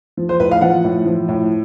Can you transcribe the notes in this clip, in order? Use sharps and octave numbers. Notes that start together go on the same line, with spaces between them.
F3
C5
A2 B4
F5
F3 F#5
A2
F3
A2